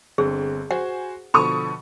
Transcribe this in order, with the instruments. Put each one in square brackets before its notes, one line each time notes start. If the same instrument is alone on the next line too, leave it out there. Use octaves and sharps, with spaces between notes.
[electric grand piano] G1 D3 C4 [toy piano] G#4
[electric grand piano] F#4 C5 G#5 [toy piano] F#5
[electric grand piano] B2 D3 F3 [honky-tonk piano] A4 C#6 D#6 [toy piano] B5